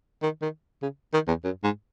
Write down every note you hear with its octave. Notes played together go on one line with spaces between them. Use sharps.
D#3
D#3
C#3
D#3
E2
F#2
G#2